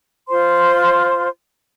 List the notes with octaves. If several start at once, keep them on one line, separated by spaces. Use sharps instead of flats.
F4 C5 C6